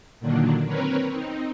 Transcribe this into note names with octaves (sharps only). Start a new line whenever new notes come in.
A#2 D3 D#3 F#3 A#3 D4
C4 A#4 B4 C#5
C4 D#4